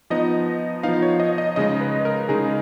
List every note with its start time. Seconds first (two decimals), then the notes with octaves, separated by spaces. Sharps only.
0.10 F3 B3 D#4 D#5
0.83 F3 B3 D#4 F5
1.02 C#5
1.20 D#5
1.38 D#5
1.56 C#3 G#3 D#4 D#5
1.81 B4
2.05 A#4
2.29 C#3 G#3 D#4 G#4